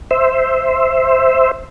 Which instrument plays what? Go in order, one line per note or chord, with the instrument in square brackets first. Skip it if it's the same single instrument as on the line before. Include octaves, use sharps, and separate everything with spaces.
[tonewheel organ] C5 E5